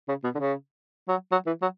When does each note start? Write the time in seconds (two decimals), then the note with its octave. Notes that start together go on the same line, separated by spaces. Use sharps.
0.09 C#3
0.24 B2
0.35 D3
0.39 C#3
1.08 F#3
1.32 F#3
1.47 E3
1.62 F#3